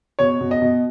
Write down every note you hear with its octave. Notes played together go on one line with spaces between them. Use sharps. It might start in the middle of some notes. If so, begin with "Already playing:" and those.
B2 C#5
B2
D#5
B2